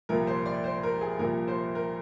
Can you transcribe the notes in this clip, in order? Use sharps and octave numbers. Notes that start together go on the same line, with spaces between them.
C2 A#2 F3 A#4
C5
D5
C5
A#4
G#4
C2 A#2 F3 A#4
C5
A#4